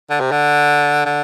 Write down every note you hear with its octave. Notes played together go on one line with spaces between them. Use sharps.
D3
C3
D3
D3